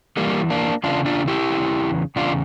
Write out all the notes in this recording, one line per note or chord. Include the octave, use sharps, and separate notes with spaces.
E2 E3 G3 A#3
A#3 D4
E2 C#3 D4 F4
D4 F4
E4 G4
E2 C#3 E3
E2 C#3 D4 F4